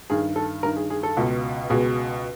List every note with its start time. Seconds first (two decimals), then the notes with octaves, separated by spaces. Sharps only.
0.10 G2 D#3 G#4
0.36 A4
0.63 G2 D#3 A#4
0.76 G#4
0.90 G#4
1.03 A4
1.17 C#2 B2
1.70 C#2 B2 G#4